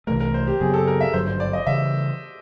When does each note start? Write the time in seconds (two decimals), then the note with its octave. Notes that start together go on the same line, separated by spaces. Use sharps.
0.07 C2 C3 E3 A3 A#4
0.20 A#4
0.34 C5
0.47 G4
0.60 F#2 C#3 F#3 B3 G#4
0.74 A4
0.87 A#4
1.01 E5
1.13 G#1 G2 D3 F#3 C5
1.27 C5
1.40 D5
1.53 D#5
1.67 C#3 E3 G3 E5